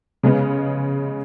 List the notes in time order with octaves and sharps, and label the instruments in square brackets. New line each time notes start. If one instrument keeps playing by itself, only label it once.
[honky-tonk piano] C#3 G#3 B3